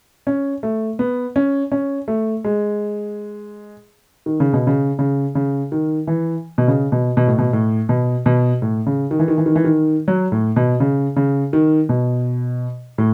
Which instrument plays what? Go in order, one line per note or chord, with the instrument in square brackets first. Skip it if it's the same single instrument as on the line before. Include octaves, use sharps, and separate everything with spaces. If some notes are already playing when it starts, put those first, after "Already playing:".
[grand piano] C#4
A3
B3
C#4
C#4
A3
G#3
D#3
C#3
B2
C#3
C#3
C#3
D#3
E3
B2
C#3
B2
B2
A2
B2
A2
B2
B2
A2
C#3
D#3
E3
D#3
E3
D#3
E3
D#3
F#3
A2
B2
C#3
C#3
D#3
B2
A2